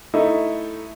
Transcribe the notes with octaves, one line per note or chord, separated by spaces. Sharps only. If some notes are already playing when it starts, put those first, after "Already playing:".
A3 D#4 E4